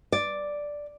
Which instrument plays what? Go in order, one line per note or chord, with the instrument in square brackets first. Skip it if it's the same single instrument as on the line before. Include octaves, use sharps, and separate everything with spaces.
[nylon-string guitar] D5